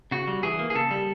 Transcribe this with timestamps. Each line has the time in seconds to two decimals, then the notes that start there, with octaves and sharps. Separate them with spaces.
0.11 C#3 F#4
0.28 G3
0.43 E3 G#4
0.59 A#3
0.70 G#4
0.75 C#3 A4
0.91 G3